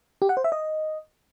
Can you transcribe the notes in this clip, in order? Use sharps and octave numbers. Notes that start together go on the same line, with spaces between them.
G4
F#5
C5
E5
D#5